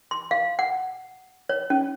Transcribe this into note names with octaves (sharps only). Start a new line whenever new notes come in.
C6
F5
F#5
C#5
C#4